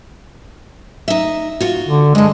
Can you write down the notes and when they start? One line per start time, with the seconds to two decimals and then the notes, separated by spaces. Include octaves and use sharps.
1.08 D#4 E5
1.61 F4 F#4
1.87 D3
2.15 G2 G#3 A4